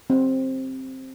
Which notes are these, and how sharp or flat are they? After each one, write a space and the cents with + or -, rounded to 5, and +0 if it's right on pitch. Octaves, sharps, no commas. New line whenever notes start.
C4 +10